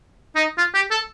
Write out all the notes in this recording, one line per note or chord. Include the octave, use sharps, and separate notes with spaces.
D#4
F4
G4
A4